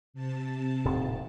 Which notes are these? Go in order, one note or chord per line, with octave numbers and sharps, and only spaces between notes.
C3 A5
D#1 A2 D#3